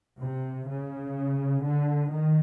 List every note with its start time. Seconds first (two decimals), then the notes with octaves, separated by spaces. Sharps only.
0.20 C3
0.67 C#3
1.62 D3
2.09 D#3